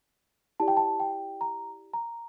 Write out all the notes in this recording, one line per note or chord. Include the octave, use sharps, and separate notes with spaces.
E4 G4 D5 A5
G5
A5
G5
A#5
A#5